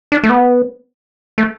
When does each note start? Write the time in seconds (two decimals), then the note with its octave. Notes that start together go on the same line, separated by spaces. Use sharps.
0.12 D4
0.24 A3
0.30 B3
1.38 A3